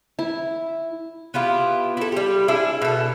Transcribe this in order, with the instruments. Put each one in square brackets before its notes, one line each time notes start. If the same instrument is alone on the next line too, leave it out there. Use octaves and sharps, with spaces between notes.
[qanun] E4
[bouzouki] B3 E4 F4 G4
E4 A4
G3 G4
D4 E4 G#4
B2 A4